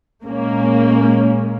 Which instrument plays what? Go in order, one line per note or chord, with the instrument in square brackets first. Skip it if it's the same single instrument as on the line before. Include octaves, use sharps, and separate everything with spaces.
[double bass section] A#2 G#3 C#4 [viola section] A#3